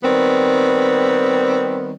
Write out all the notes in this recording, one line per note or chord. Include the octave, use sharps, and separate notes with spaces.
D#3 G3 B3 C4